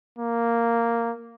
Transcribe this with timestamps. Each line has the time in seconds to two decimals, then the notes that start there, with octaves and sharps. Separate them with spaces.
0.18 A#3